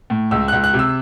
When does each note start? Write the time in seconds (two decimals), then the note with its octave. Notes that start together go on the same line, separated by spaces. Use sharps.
0.10 A2
0.31 C#2 E6
0.48 C#2 F#6
0.64 F#6
0.74 C3
0.79 E6